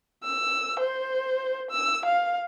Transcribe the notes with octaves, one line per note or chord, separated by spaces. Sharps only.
E6
C5
E6
F5